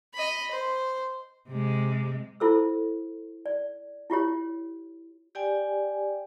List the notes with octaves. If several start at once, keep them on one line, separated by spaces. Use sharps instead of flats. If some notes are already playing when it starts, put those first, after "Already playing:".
D#5 B5
C5
C3 G#3
E4 F4 A4 C5 E6
D5
E4 F4 G4 C#5
G4 D5 G5 G#5